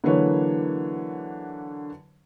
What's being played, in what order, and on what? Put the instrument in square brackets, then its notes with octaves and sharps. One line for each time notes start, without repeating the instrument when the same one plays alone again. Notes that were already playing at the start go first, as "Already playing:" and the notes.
[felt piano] D3 E3 F#3 A#3 B4 C#5